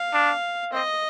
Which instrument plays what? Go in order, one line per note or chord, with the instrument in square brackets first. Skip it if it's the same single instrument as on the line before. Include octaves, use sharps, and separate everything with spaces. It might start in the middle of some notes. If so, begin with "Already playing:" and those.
Already playing: [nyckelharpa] F5
[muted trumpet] D4
[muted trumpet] C4 [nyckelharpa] D#5